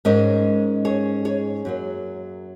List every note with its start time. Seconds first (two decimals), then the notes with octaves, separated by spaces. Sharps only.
0.05 G#2 G#3 C#4 A#4 D#5
0.85 G#4 C#5
1.25 G#4 C#5
1.65 F#2 F#3 A#3